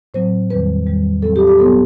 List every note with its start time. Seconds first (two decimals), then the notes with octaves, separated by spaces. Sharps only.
0.14 A2 F#3 C4 C5
0.50 E2 D#3 G3 C4 B4
0.87 E2 D#3 G3
1.23 A2 F#3 C4 A4
1.36 G4
1.47 G4
1.59 B2 F#3 B3 A4